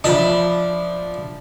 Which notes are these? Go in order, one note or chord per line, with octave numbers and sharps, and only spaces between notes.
F3 D4 E5 B5